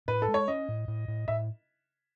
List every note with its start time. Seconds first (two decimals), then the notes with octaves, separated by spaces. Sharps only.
0.08 A2 B4
0.22 A4
0.28 G#3
0.34 C#5
0.48 C#4 D#5
0.69 A2
0.88 A2
1.08 A2
1.28 A2 E5